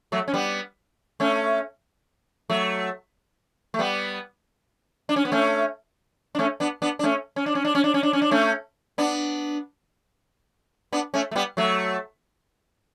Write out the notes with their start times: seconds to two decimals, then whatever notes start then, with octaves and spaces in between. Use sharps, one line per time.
0.12 F#3 A3
0.28 C#4
0.34 G3 B3
1.20 A3 C#4
2.50 F#3 A3
3.74 A3
3.79 G3 B3
5.09 D4
5.16 C#4
5.25 B3
5.32 A3 C#4
6.35 D4
6.39 A3 C#4
6.60 B3 D4
6.82 B3 D4
6.99 D4
7.03 A3 C#4
7.36 C#4
7.46 D4
7.55 C#4
7.65 D4
7.75 C#4
7.84 D4
7.94 C#4
8.03 D4
8.13 C#4
8.22 D4
8.31 A3 C#4
8.98 B3 D4
10.92 B3 D4
11.14 A3 C#4
11.31 A3
11.36 G3 B3
11.57 F#3 A3